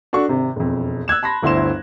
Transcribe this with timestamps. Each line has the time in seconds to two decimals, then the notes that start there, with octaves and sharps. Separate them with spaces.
0.13 D4 F#4 A4 C#6
0.28 G#1 C3
0.56 E1 F2
1.08 E6 F#6 G#6 E7
1.23 A5 B5 C6 A#6
1.42 G1 D2 E4 C5 C6 E7